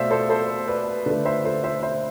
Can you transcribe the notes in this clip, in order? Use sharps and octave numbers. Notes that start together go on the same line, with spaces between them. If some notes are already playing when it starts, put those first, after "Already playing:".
Already playing: B2 A3 C5 D5 E5 F5
A4 C5
A4 C5
B4 D5
D3 A3 B4 D5
C5 E5
A4 C5
C5 E5
C5 E5